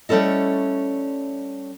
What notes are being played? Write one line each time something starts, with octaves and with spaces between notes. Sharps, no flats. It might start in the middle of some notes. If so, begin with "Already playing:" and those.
G3 A3 C#4 E4 A4 D#5